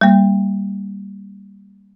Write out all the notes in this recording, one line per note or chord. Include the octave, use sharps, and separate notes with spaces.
G3 A#3